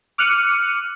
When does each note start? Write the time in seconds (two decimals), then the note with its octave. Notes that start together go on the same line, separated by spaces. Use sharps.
0.18 D6 F6 F#6 C#7 D#7